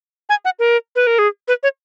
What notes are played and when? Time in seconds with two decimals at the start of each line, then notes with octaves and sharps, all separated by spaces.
0.29 G#5
0.45 F#5
0.59 A#4
0.96 B4
1.07 A#4
1.19 G#4
1.48 B4
1.63 C#5